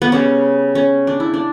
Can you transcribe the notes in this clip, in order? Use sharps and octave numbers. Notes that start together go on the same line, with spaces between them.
B3
C#3 G3 B3 C#4
C#4
D4
E4
D4